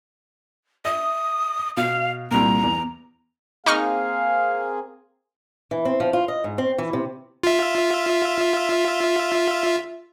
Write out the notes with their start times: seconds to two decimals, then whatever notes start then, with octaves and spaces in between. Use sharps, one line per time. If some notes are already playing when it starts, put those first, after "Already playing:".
0.85 E5 D#6
1.77 B2 F5
2.31 C2 A#2 A#5
2.63 E2
3.66 A#3 C4 D#4 G#4 F5 C#6 F6
5.71 E3
5.85 C4
6.00 F3
6.13 F4
6.28 D#5
6.44 G#2
6.58 C4
6.78 E3
6.93 C3
7.43 F4 E5